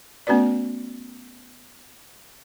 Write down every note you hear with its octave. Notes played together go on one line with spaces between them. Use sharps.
A3 B3 C#4 F#4 B4 D5